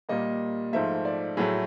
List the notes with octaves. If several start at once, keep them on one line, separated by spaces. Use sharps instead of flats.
A#2 G3 A#3 D#5
G#2 F3 A3 E5
D5
A2 F#3 A3 G#4